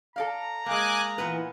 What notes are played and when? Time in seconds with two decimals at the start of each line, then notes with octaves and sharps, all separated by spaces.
0.16 A4 D5 F5 A#5
0.66 G#3 A#3 G#5 D6 F#6
1.18 A#2 E3 B3 B4